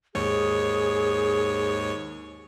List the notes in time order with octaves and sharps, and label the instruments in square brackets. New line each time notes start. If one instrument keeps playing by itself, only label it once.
[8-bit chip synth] D#2 G#2 C#5 [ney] G#4